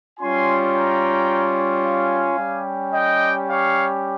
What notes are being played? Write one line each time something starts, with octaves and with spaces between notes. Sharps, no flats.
G3 C#4 F4 G#5 C6
G5 A#5
F5 G#5
G3 C#4 G4
D#5 G5
C#5 F5